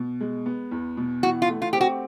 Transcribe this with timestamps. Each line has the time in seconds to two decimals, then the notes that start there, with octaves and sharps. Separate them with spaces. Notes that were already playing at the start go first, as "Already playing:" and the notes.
Already playing: B2
0.21 G#3
0.46 B3
0.71 E2
0.97 B2
1.23 E3 F#4
1.42 F4
1.49 A3
1.62 F4
1.73 C4 G4
1.81 F#4